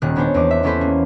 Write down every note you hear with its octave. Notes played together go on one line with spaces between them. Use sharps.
D#1 D#3 G3 F#6
G#3 B3 D4 C5 C#5
E2 E3 D#5 D6
E5
B3 C#4 E4 A4 B4 C5
A#3